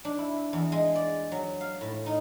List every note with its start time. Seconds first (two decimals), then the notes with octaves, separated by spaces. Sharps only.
0.05 D4
0.18 E4
0.53 E2
0.72 G#3
0.95 D5
1.32 F#3
1.61 F5
1.81 A2
2.06 D#4